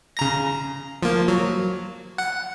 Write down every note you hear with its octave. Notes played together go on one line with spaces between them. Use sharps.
C#3 A#5 A#6
F3 A#3
F#3
F#5